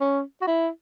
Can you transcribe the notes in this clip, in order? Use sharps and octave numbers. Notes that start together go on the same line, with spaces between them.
C#4
F#4
E4